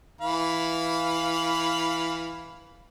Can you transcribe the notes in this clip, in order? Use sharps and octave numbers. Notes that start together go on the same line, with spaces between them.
E3 F5 B5